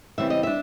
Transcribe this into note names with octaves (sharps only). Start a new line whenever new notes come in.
C#3 E3 G3 C4 E5
D#5
D4 E5